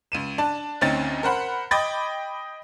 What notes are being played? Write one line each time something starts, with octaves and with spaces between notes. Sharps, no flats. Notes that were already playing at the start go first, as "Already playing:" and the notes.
C#2 D#7 E7
D4 A5
D2 C4 C#4 D#4 A6
A#4 C5 F#5 B5
D#5 G5 B5 D6 G#6 A6